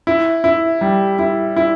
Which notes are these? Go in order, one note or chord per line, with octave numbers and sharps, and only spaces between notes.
E4
E4
G3
E4
E4